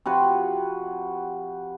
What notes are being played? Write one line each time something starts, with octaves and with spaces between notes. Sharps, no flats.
C3 F3 F#4 B4